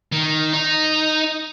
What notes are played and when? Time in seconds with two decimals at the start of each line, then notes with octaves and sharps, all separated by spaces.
0.12 D#3
0.53 D#4